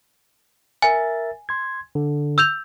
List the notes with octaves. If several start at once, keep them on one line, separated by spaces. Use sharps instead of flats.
A#4 E5 G#5 A6
C6 G#6
D3
E6 G6 F7